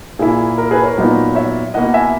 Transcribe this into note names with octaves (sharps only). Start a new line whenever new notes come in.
A#2 A#3 E4 G#4
A#4
G#4 B4
A#4 C#5
A#2 F#3 B3 D#4
C#5 E5
B2 A#3 E4 D#5 F#5
E5 G#5